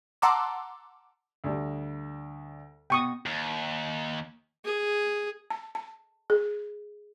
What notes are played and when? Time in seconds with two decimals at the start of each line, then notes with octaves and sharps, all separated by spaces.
0.22 F#5 A5 A#5 C6 D6 E6
1.44 D2 G3
2.90 B2 G5 C#6 D#6
3.26 D#2
4.64 G#4
5.50 A5
5.75 A5
6.30 G#4